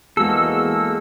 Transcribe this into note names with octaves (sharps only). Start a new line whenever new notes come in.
E2 G#3 A#3 F#4 G#4 A4 E6